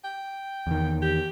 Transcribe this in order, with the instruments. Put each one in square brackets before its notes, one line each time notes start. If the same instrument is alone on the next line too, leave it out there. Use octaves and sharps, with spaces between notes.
[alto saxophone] G5
[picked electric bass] E2 D#3
[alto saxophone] G4